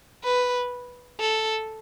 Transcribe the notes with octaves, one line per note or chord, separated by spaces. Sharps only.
B4
A4